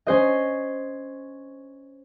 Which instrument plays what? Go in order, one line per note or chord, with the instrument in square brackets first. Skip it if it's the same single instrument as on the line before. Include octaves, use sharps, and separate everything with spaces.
[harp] C#4 C5 D#5